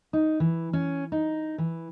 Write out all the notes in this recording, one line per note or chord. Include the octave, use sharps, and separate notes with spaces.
D#4
E3
C#4
D#4
E3